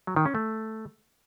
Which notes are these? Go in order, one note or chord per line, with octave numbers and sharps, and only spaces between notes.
F#3
D#3
C#4
A3